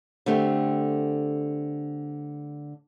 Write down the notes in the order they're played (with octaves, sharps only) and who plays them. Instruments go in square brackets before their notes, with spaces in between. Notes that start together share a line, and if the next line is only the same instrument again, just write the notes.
[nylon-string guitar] D3 A3 C4 G4